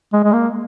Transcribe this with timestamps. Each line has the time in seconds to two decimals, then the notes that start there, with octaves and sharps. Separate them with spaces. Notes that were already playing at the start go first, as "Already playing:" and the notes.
0.13 G#3
0.24 G#3
0.33 A#3